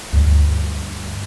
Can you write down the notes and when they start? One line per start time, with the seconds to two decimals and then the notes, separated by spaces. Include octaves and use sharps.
0.13 D2 G2